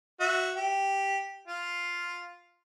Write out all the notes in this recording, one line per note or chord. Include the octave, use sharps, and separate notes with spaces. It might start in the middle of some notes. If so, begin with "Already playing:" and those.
F#4 E5
G4
F4